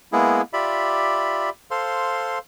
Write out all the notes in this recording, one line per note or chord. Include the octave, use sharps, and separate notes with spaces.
G#3 A#3 B3 E4 G#4
F4 G4 D5 E5 B5
A4 C5 F5 C6